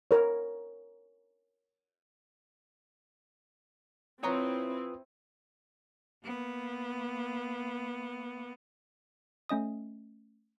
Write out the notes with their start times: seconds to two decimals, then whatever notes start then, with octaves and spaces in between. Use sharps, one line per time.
0.11 A#4 C#5
4.23 C4 E4 F4 B4 C#5 A#5 D#6
6.24 A#3 B3
9.49 A3 C#4 D#5 D#6